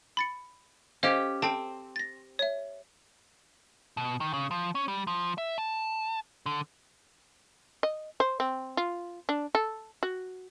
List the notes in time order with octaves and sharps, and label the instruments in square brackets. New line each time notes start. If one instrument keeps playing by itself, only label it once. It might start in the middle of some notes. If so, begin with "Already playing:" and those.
[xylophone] B5 A6 C#7
[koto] C#4 G4 [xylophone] C5 D#5 F5
[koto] C4 [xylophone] G5 A5
[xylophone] A6 A#6
C#5 E5
[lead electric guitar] B2
D#3
C#3
F3
C#4
G3
F3
E5
A5
D3
[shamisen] D#5
C5
C4
F4
D4
A4
F#4